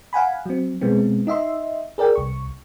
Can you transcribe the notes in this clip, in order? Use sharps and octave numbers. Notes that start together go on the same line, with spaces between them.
F5 F#5 G#5 B5
F#3 C4
B2 G#3 B3 C4
D#4 D#5 E5 C6
G#4 A#4 D5 G5
C2 C#6